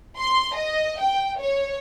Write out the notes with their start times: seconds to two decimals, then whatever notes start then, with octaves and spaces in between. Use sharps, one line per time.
0.18 C6
0.56 D#5
1.00 G5
1.39 C#5